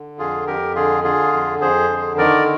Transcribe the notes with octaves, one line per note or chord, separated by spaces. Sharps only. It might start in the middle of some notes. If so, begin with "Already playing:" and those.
Already playing: D3
F2 F4 G#4
F2 G4 A#4
D3 F4 G#4
D3 F4 G#4
F2
F2 G#4 C5
D3
D#3 A#4 D5